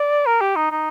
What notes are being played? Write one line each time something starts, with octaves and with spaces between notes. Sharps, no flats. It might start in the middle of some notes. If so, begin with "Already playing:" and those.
Already playing: D5
A#4
G4
D#4
D#4